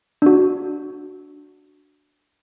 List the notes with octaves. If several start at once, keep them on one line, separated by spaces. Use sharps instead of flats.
D4 F#4